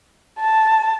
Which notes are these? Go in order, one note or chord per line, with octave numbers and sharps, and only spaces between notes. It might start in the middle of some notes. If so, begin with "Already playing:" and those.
A5